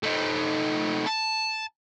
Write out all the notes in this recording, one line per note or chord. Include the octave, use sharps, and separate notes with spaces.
A3 D#4
A5